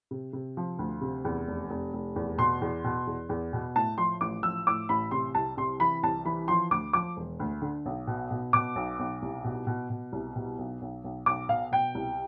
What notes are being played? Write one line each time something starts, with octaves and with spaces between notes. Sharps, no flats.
C3
C3
F3
D2
C3
E2
F1
F1
F1
E2
B2 C6
E2
B2
E2
E2
B2
A2 A5
F3 C6
A1 D6
F3 E6
A2 D6
A1 B5
C3 C6
C2 A5
C3 C6
E3 B5
C2 A5
E3 B5
F3 C6
D2 D6
F3 D6
E1
D2
D3
B1
B2
B2
B2 D6
B1
B1
C2
B2
B2
B2
C2
B2
B1
B1
B1
B1 D6
B2 F5
B2 G5
C2